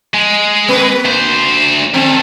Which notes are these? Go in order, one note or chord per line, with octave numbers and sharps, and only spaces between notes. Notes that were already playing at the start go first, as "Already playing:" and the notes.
G#3
A#3 B4
D2 C5
D#3 C4 A4